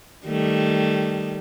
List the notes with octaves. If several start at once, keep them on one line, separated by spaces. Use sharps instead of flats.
D#3 G3 A3